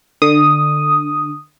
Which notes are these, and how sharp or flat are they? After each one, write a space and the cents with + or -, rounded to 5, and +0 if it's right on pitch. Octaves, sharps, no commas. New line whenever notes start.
D3 +15 D#6 +0